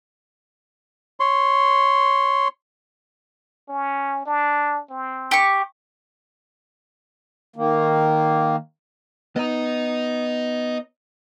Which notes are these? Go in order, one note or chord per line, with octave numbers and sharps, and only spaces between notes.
C#5 C6
C#4
D4
C4
G4 C#6
D#3 A#3
B3 D#5 A#5